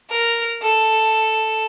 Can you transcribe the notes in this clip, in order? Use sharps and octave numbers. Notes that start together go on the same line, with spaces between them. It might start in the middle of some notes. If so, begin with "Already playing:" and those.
A#4
A4